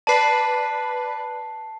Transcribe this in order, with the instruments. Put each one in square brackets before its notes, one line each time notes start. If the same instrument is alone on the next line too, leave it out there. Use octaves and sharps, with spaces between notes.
[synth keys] B4 D5 [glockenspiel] A5 C7